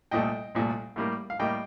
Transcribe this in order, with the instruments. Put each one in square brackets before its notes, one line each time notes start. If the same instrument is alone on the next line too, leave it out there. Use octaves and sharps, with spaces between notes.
[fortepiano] C2 A#2 A3 D#5 G5
C2 A#2 A3
A2 G3 A#3
F5
A2 G3 A#3 D#5 G5